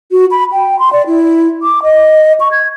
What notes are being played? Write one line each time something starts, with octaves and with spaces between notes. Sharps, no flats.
F#4
B5
G5
C6
D5
E4
D6
D#5
C#6
G#6